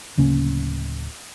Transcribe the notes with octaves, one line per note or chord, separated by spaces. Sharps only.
D1 C#3 A#3 C#4